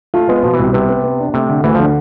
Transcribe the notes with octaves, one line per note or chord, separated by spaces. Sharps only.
A3 F4
G#3 B3
B2 F3
E3
C2 C3
C3 B3
B3
B3
D4
C3 A3
D3
D2 E3
D3 F3